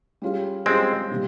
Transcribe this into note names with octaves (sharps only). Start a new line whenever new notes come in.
G3 C#4 F4 G#4
G3 G#3 C4 C#4 F4 G#4
C3 D#3 G3 A#3